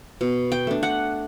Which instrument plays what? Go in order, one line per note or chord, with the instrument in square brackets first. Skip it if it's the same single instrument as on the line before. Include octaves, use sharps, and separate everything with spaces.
[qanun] B2
G5
A3 D4
F#5